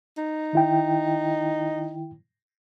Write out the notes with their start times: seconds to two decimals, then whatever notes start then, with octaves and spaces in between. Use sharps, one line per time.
0.17 D#4
0.53 D#3 E4 G5